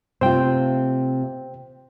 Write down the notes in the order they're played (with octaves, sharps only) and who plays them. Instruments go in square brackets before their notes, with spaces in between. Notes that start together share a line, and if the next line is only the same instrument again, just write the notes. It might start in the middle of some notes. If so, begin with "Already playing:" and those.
[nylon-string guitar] C3 A3 F4 [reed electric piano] C5 G5